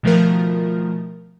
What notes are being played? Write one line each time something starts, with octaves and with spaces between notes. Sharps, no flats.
B2 D#3 F3 A3 F4 A#4